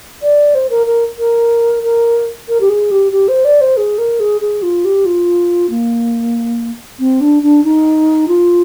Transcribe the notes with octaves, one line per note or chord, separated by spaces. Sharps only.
D5
C5
A#4
A#4
A#4
A#4
A#4
G4
G#4
G4
G4
C5
D5
C5
G#4
A#4
G#4
G#4
F4
G4
F4
A#3
C4
D4
D4
D#4
F4